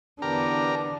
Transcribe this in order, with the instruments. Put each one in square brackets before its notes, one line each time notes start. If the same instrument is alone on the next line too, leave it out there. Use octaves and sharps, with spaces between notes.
[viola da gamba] E2 D3 B3 [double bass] D4 [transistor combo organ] G4 A#4 A#5